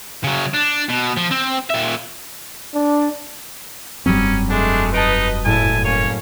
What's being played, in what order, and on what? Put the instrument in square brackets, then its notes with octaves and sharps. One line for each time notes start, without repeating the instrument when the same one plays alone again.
[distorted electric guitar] C#3 F#3
D4
B2
F3
C4
A#2 E5
[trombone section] D4
[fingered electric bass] F1 G2 C4 [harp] F#3 G3 [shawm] C#4
[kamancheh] G#3 A3 [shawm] D4
[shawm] D#4 [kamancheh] B4 D#5 [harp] A5 D7
[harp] F#1 A2 [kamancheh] E4 A5 [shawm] G#5
[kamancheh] A#3 C#4 [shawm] C#5